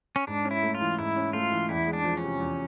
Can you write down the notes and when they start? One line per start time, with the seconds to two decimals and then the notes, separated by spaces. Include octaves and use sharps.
0.16 C#4
0.27 G#2 D4
0.45 C#4
0.51 E4
0.63 A3
0.75 F4
0.81 E3
0.99 G#2 E4
1.16 C#4
1.33 A3 F4
1.52 E3
1.69 E2 E4
1.87 G#3
1.93 D4
2.05 F3
2.17 C#4
2.23 C3
2.40 E2